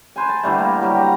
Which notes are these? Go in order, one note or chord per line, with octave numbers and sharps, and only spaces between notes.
B4 C5 G#5
A5
D3 E3 G3 A3
A#3
F#3 G3 G4
A#5